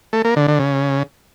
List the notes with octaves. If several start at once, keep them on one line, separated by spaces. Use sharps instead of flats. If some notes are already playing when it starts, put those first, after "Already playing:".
A3
A#3
D3
D3
C#3